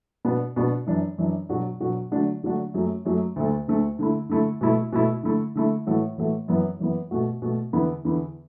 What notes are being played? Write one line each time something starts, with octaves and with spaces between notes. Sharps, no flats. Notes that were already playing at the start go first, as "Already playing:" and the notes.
B2 B3 D4
B2 B3 D4
F#2 E3 D4
F#2 E3 D4
B2 F#3 D4 F#4
B2 F#3 D4 F#4
D3 F#3 A3 D4 F#4
D3 F#3 A3 D4 F#4
F#2 F#3 A3
F#2 F#3 A3
D2 D3 A3
D2 D3 A3
D3 A3 E4
D3 A3 E4
B2 A3 E4
B2 A3 E4
D3 A3 E4
D3 A3 E4
A2 E3 A3 F#4
A2 E3 A3 F#4
F#2 E3 B3
F#2 E3 B3
B2 A3 F#4
B2 A3 F#4
E2 D3 B3 E4
E2 D3 B3 E4